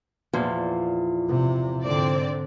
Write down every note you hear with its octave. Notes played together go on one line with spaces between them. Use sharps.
E2 A#2 F3
C3
G#2 D3 C4 D5